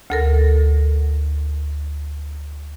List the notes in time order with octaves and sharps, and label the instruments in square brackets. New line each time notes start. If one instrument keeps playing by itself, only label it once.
[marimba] D2 A4 A#4